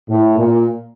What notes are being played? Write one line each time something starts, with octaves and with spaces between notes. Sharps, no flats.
A2
A#2